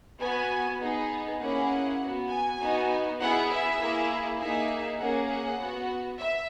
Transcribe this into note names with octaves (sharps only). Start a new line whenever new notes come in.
B3 F#4 G#5
B3 D#4 G#4
A#3 C#4 E4 G#4 F#5
B3 F#4
G#5
B3 D#4 F#4
B3 E4 G#4 F#5
E5
A#3 E4 G#4
A#3 D#4 G#4 E5
A#3 C#4 G#4 F#5
F#5
B3 F#4
E5